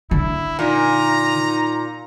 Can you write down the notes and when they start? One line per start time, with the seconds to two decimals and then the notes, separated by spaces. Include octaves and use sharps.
0.11 D3 E4
0.59 A#2 D#4 A#5